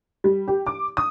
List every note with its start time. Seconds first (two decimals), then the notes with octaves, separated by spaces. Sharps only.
0.24 G3
0.48 G4
0.67 D6
0.97 D#6